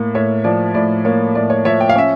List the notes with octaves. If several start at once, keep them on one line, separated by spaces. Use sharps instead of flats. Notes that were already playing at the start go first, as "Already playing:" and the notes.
Already playing: A2 A#3
A2 C#5 E5
F3 D5
A2 D5
A#3 C#5
A2 D5
C#5
F3 C#5 E5
G5
F5
C#4 E5